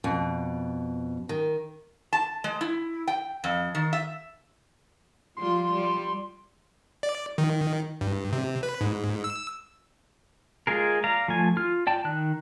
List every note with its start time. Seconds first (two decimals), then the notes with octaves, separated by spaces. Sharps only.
0.04 F2 B2
1.29 D#3
2.13 A5
2.44 G#3
2.61 E4
3.08 G5
3.44 F2
3.75 D#3
3.93 E5
5.37 F3 G3 F4 C6
5.73 G3
7.03 D5
7.38 D#3
8.01 G2
8.32 C3
8.63 B4
8.81 G#2
9.24 E6
10.67 G#3 F4 G#4 A#4
11.04 D5 F5 A#5
11.28 F3 A3 G#5
11.57 F4 F6
11.87 D5 G5 A5
12.05 D#3 F#6